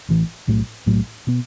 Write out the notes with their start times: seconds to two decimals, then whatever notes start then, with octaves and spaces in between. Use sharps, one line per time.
0.09 A1 A2 E3
0.47 B1 A2 F#3 A3
0.86 B1 A2 F#3 A3
1.27 B2 B3